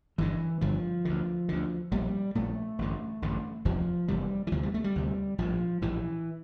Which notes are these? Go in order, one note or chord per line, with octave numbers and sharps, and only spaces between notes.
G1 G2 D3 E3
G1 G2 D3 F3
D2 D3
D2 D3
A#1 A#2 G3
A#1 A#2 A3
A1 G2 D3
A1 G2 D3
F1 E2 C3 F3
F1 E2 C3 G3
E3
D2 C3 F3
G3
A3
G3
D2 C3
A#1 A2 F3
A#1 A2 E3